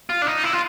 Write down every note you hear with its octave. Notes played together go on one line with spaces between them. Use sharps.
F4
D4
D#4
E4
F4